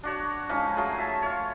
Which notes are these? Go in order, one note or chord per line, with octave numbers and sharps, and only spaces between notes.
D4 F#4 C#5
F3 G#3 C#4 D#4
F#3 A3 F4 G#4
E5 A5
F4 C#5